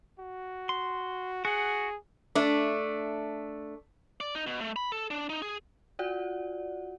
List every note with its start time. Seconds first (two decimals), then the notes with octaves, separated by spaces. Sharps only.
0.19 F#4
0.69 C6
1.45 F#4 G#4 F#5
2.35 A3 D4
4.20 D5
4.35 D#4
4.47 B2
4.61 A3
4.76 B5
4.92 A4
5.11 D4
5.29 D#4
5.42 G#4
5.99 F4 F#4 D5 F#5